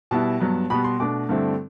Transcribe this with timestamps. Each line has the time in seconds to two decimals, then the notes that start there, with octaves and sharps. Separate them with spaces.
0.11 B2 G3 B3 E4 A5
0.40 G2 F#3 B3
0.70 B2 G3 B3 B5
0.84 C6
1.00 B2 A3 D4 D6
1.29 G2 D3 A3 C4 E4